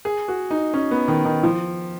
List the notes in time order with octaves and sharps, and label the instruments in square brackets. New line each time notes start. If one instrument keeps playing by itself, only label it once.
[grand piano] G#4
F#4
D#4
C#4
B3
D#3
D#3
F3